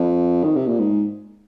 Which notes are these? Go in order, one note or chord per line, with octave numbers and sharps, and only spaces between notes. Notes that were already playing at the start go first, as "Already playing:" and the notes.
Already playing: F2
D#3
C3
A#2
G#2